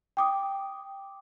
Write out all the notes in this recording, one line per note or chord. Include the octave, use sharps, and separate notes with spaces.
G5 D6 D#6